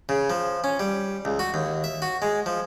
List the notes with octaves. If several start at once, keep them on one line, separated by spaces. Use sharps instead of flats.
C#3
F3
C#4
G3
C#2
F#4
D#2
E5
F#4
G#3
F3